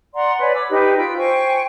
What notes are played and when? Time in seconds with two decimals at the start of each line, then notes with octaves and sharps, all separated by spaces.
0.15 D5 F#5 A#5 C6
0.40 B4 C#5 D5 G#5
0.54 D6 E6
0.70 D#4 G4 B4
0.98 F4 G5 E6
1.17 C5 G5 G#5 C#6